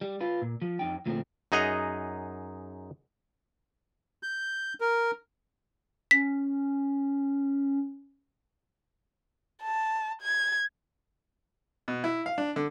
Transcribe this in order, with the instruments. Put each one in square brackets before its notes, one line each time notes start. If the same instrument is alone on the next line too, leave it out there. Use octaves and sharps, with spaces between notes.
[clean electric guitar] G3
F4 B4
A#2
F3
F2 D#4 G5
D2 A#2 F3 A3 C4
[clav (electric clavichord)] F#2 D#4 G#4 D#5 F#5 A#5
[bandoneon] G6
A#4
[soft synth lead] C#4 [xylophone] B6
[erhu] A5
G#6
[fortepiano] B2
E4
F5
D4
D3